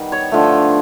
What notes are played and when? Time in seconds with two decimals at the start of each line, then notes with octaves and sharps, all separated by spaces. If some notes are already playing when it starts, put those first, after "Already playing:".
Already playing: D#3 G3 B3
0.12 C#5
0.32 D3 F3 A3